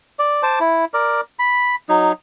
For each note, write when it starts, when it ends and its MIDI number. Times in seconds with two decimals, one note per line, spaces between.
0.19 0.42 74
0.43 0.59 72
0.43 0.59 81
0.43 0.59 86
0.60 0.85 64
0.94 1.21 70
0.94 1.21 74
1.39 1.75 83
1.89 2.12 54
1.89 2.12 63